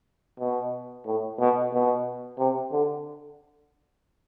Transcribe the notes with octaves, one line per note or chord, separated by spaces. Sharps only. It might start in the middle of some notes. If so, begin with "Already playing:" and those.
B2
A2
B2
B2
C3
D3